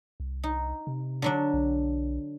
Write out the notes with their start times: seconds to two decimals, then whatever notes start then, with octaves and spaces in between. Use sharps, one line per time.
0.20 C2
0.44 D#4
0.87 C3
1.22 D3 F#3 D4
1.54 B1